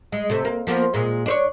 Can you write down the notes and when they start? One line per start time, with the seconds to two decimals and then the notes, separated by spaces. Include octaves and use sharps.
0.12 G#3
0.30 C3 A3
0.45 A#3
0.67 F3 A#3 B3
0.94 A#2 G#3
1.26 D4 C5 C#5